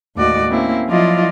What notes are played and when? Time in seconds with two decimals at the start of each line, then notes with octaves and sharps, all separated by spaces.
0.16 D#2 A2 G#3 F#4 D5 D#5
0.50 A#3 C4 C#4 E4
0.87 F3 F#3 E4 F4 D5 D#5